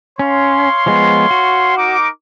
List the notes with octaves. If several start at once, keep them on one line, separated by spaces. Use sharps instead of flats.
C#4 C#5 F5 C6
F3 G#3 B3
F#4
D#4 A#4 D6